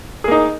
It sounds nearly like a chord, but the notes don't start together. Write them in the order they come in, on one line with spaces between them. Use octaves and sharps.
G#4 A#3 D#4